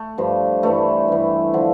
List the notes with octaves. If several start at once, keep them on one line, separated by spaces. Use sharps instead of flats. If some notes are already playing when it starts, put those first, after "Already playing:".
Already playing: A3
G2 F3
G2 E3 A3
G2 E3
D3 F3